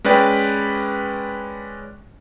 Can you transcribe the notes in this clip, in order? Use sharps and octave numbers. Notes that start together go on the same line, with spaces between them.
G#3 C#4 B4 D5 G5